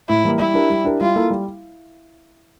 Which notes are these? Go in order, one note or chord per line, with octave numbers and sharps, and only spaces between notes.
A2 E4
E3 G3 A#3
G3 E4
D4 G4 A#4
G3
D4 G4 A#4
G3 F4
A#3 E4 A4
G3